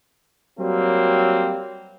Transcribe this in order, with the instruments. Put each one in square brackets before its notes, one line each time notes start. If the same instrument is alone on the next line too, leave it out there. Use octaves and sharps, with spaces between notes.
[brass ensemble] F#3 G3 A#3 C4